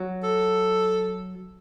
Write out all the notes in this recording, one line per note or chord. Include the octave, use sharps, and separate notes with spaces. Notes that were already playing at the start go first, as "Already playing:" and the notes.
Already playing: F#3
A4